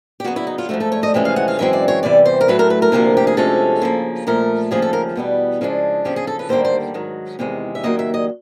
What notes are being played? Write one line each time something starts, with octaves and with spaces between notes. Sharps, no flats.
G4
C#3 F#3 B3 F#4
E4
D#4
F4
G#2 F3 A3 F#4
A4
C#5
D#5
F2 C3 E3 G#3 C#4
F5
F#5
F5
F#2 C#3 E3 G#3 C4 E5
D5
C#5
E2 C3 E3 G3 D5
C5
A#4
A2 F#3 A3 B4
A#4
B4
A#4
D2 C3 F3 A#3
G4
G#4
C3 F3 G#3 C#4 A4
C#3 F3 A#3
A#2 F3 A3 A#4
D#2 C#3 F3 G#4
A4
A#4
E2 B2 G3 B3
C#3 F3 G#3 B3 D4
E2 C#3 F3 G4
G#4
A4
B4
D#2 D3 G3 A#3 C5
C5
G#2 D#3 F#3
E2 C3 D#3 G#3
E5
D#2 C#3 F#3 A#3 D#5
E5
D#5